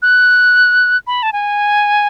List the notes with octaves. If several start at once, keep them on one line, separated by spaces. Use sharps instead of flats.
F#6
B5
A5
G#5